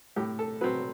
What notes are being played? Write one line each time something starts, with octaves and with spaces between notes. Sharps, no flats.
A2 G4
A4
F#3 C4 B4